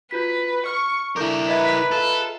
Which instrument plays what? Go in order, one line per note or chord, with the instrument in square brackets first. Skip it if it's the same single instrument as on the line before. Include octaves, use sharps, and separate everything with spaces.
[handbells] F4 F#4 B6 [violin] B4
[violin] C#6 [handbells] F6
[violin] D4 [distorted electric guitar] E4 A#4 [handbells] A4 D6 G6
[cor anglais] B4 [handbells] D#5 E5 A#5 [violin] B6
[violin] F4 [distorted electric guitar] A4